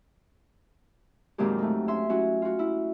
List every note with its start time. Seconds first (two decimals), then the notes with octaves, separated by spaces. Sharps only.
1.38 F2 A#2 D#3 F#3 G#3 G4
1.58 A3 D#4
1.88 C#4 E5 C6
2.09 F#3 C#4 E4 F#4
2.42 F4 F#4
2.59 E4